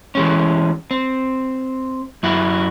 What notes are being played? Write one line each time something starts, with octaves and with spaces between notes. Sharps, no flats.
E3 G#3 C#4
C4
F#2 E4 F#4